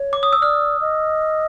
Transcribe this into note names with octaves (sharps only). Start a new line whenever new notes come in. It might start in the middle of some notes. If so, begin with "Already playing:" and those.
Already playing: C#5
D6
D#6
E6
D5 F6
D#5